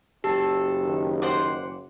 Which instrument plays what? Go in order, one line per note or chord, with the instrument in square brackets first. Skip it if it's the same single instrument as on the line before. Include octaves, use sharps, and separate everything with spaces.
[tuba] F#1 [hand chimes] G4 [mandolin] A4
[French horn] D#3
[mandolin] C5 F#5 D6